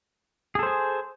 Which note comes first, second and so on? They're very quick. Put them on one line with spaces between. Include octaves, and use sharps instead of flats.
G#4 A4 C5 G#5